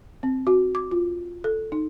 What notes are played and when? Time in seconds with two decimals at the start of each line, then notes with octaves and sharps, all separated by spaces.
0.23 C4
0.47 F#4
0.75 D6
0.91 F4
1.44 A4
1.72 D#4